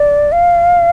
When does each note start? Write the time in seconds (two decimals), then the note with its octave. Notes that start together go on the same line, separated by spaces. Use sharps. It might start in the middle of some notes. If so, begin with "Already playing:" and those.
Already playing: D5
0.32 F5